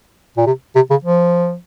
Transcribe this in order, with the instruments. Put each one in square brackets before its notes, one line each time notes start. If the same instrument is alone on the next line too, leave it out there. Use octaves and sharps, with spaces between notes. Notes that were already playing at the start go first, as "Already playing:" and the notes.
[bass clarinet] A#2
C3
C3
C#3
F3